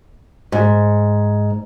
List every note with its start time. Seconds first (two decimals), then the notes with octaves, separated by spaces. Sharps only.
0.52 G#2